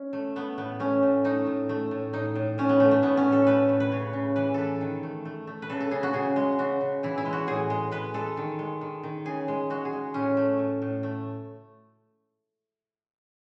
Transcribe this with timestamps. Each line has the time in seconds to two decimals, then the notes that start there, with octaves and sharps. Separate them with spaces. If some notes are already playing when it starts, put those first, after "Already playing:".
Already playing: C#4
0.13 A3
0.36 A3 B3
0.58 A2 B3
0.80 A3 C#4
1.03 A2
1.24 A3 D#4
1.46 A2
1.69 A3
1.91 A2
2.13 A2 D#4
2.35 A2
2.58 A2 C#4
2.69 B3
2.80 A2 A3
2.91 A3
3.02 A2 B3
3.17 C#4
3.25 A2
3.32 A4
3.47 A3 B4
3.69 A2
3.80 B4
3.91 C#3 C#5
4.13 C#3
4.36 E3 B4
4.54 E3 A4 B4
4.81 D#3
5.03 A3
5.25 A3
5.47 A3
5.62 B4
5.70 C#3 A4
5.80 A4
5.91 C#3 G#4
6.03 F#4
6.13 C#3 G#4
6.36 G#3
6.58 C#3 F#4
6.81 C#3
7.03 E3 E4
7.18 E4
7.25 G#3
7.33 F#4
7.47 A2 G#4
7.70 G#3
7.91 G#3 B4
8.14 G#3 A4
8.37 D#3
8.59 G#3
8.81 D#3
9.03 D#3
9.26 C#3 G#4
9.48 G#3
9.70 G#3 F#4
9.85 G#4
9.93 G#3
10.14 A2 C#4
10.37 A3
10.59 A2
10.82 A2
11.03 A3